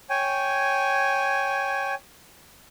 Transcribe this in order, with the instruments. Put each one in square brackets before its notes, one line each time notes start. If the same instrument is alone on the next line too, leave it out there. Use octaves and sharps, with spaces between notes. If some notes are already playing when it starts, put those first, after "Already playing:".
[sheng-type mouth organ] C#5 G5 G#5